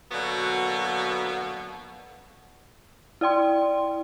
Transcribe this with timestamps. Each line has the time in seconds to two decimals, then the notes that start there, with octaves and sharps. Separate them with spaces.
0.12 B2 D3 F#3 A#3 B3
3.21 E4 D5 G5 C6